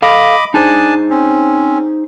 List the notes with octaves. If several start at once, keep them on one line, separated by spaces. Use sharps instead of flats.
A4 D#5 F5 B5 D6
D4 D#4 G#4 C5 G#5 A5
C4 C#4